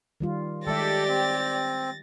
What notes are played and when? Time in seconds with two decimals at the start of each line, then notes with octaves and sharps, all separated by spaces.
0.20 D#3 G3 F4
0.67 D#3 G#3 G4 A4 D5 E5 A6 A#6
1.09 C4